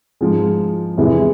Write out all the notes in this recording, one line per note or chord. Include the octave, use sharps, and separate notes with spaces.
G#2 F3 G#3
E2 C3 E3 G#3